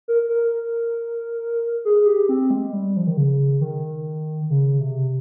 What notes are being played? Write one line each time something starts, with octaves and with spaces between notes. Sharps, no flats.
A#4
A#4
G#4
G4
C4
G#3
G3
F3
D#3
C#3
D#3
C#3
C3